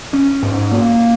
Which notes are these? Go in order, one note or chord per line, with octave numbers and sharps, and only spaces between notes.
C#4
G#2
A#3